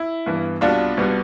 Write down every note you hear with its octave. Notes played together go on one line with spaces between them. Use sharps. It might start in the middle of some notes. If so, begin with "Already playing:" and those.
Already playing: E4
G2 E3 B3
C2 B2 B3 D4 F4
C2 B2 B3